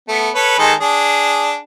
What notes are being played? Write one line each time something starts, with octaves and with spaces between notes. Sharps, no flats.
A3 B3
A4 B4 C#5
D#3 G#3 A4
D4 G#4